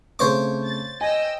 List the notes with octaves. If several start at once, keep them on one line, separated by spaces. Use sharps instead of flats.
C#3 A3 C4 C5 C#5 D6
A6
D#5 G5 G#5 E6